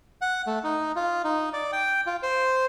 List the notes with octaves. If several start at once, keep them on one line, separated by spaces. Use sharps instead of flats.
F#5
A3
D#4
F4
D#4
D5
G5
F4
C5